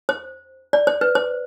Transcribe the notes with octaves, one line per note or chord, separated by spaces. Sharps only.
C5
D5
C5
B4
C5